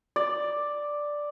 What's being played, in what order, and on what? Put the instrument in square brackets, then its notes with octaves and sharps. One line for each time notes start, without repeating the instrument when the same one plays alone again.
[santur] D5